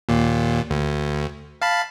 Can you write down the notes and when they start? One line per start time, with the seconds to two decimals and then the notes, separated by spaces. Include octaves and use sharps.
0.09 D#2 A#2
0.70 D2
1.62 F5 A5 B5